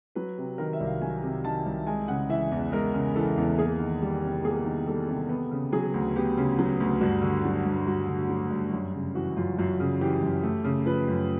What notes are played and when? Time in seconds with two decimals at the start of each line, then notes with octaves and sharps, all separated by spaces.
0.15 F#3 B4
0.38 C3
0.58 D#3 A#4
0.73 E5
0.80 C2
0.87 F5
1.01 F#3 G#5
1.23 C3
1.44 D#3 A5
1.66 C2
1.87 G#3 G#5
2.08 C#3 F#5
2.29 E3 E5
2.51 E2
2.72 G#3 A#4
2.94 C#3
3.16 E3 A4
3.38 E2
3.58 A#3 G#4
3.80 D#3
4.02 G3
4.23 C3
4.43 A#3 G#4
4.66 D#3
4.87 G3 A4
5.08 C3
5.29 B3
5.51 C#3
5.73 F#3 G#4
5.94 D2
6.16 B3 G4
6.37 C#3
6.59 F#3
6.80 D2
7.01 G2 F#4
7.22 D3
7.44 F#3
7.65 G2
7.87 G2 F#4
8.08 D3
8.29 F#3
8.51 G2
8.72 F#2
8.94 C#3
9.14 E3 F#4
9.36 F#2 F4
9.58 F#2 F#4
9.80 C#3
10.01 E3 G4
10.23 F#2
10.43 A3
10.64 C#3
10.86 F3 B4
11.08 F#2